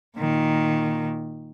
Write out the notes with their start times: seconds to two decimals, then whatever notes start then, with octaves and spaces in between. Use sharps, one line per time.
0.17 A#2 D#3